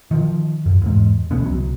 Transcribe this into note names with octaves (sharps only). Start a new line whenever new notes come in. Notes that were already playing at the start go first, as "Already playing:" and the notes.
D#3 F3
F#2
E2 G#2
E1 D2 B3 C#4
C2 F#3